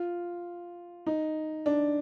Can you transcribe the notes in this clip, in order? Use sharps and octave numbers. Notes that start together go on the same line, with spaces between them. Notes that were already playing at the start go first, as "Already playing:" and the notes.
Already playing: F4
D#4
D4